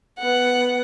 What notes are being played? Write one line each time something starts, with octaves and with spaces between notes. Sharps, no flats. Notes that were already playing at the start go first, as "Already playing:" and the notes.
B3 F#5